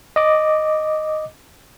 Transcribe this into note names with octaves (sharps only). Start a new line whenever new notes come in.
D#5 D6